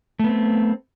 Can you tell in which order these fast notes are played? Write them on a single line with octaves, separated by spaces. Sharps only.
A3 B3 C4